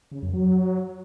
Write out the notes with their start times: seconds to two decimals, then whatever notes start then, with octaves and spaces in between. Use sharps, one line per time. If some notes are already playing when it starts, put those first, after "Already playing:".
0.12 C#3
0.22 F#2
0.33 F#3